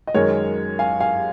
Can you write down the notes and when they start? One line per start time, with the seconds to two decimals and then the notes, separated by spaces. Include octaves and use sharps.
0.07 D#5
0.14 F#2 D#3 G#3 A#4 C#5
0.79 F5 G#5
1.00 F5 G#5